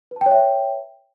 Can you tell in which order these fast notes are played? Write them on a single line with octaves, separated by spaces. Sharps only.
B4 A5 G5 C#5 E5